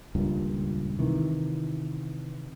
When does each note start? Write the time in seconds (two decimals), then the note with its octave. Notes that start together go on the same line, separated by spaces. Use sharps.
0.15 D#1 C#2 G2 A#2
0.99 C3 D#3 E3